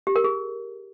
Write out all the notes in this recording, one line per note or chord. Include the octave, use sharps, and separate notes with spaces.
G4
A#4
G#4